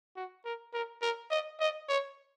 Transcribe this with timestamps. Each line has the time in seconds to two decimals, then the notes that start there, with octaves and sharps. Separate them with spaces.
0.16 F#4
0.45 A#4
0.74 A#4
1.02 A#4
1.31 D#5
1.60 D#5
1.89 C#5